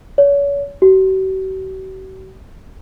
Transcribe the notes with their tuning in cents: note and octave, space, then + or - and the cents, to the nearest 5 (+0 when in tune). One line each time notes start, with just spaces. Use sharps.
C#5 +35
F#4 +45